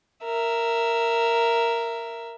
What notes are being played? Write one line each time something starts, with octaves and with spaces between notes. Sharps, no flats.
A#4 E5